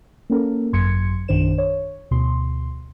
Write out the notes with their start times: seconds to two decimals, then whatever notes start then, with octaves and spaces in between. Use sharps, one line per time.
0.30 A#3 C#4 A4 A#4
0.72 G#1 F#2 F#3 C6 G#6 C#7
1.28 A#1 F#2 D#3 D4 C5 E7
1.58 C#5
2.11 D2 B2 C6